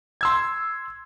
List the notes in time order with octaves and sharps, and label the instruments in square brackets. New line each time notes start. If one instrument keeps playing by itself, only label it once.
[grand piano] C6 E6 G#6